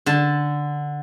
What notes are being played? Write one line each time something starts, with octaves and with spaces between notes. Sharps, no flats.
D3 A5